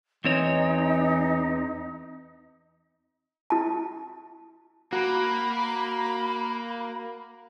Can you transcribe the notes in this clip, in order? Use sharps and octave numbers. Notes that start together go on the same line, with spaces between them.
E2 E3 C4 D#4 C#5
E4 A5
A#3 F#4 B5